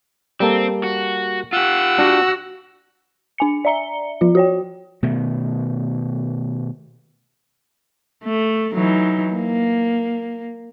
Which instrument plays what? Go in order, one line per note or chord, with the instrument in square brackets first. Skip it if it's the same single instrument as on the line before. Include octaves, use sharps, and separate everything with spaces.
[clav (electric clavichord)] G3 A#3 A4 [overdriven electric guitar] C4
[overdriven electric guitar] F#4
[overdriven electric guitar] F4 G4 [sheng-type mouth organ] F#5 E6
[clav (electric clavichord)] D4 [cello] F#4
[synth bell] D4 G#5 C#7
D5 E5 A#5 C#7 G7
F3 F4
F#4 C#5 G5
[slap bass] B2 D#3 A3
[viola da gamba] A3
E3 F#3 D#4
A#3